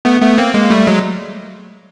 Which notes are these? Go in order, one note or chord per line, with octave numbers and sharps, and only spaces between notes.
A3 B3
A3 B3
A#3 C4
G#3 A#3
G3 A3
F#3 G#3